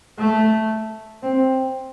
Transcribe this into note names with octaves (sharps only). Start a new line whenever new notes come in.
A3
C4